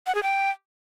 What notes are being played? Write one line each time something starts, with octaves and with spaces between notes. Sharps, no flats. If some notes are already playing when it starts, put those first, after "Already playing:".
F#5
G#4
G5